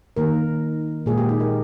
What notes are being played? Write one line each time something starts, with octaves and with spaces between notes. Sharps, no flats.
D#3 A#3 A#4
A#2 G#3 G#4
G4
D#4
A#4